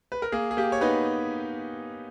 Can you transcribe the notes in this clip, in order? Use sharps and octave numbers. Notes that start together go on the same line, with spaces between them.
B4
A#4
A#3 G#4
G#4
A#3 G4
C#5
B3 D#4 B4